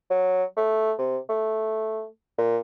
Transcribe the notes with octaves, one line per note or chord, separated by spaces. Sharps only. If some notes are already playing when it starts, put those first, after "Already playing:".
F#3
A3
C3
A3
A#2